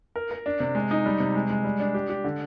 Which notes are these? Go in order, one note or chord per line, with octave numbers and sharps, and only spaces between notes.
A#4
A#4
D4
C3
G#3
D#4
G3
C3
G#3
G#3
G3
D4
G4
G4
D3